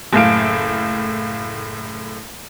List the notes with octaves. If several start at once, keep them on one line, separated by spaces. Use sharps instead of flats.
F#1 A2 F5 D7